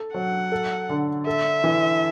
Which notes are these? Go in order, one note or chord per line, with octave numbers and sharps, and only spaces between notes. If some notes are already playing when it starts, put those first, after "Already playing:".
Already playing: A4
F#3 F#5
A4
D3
A4 E5
E3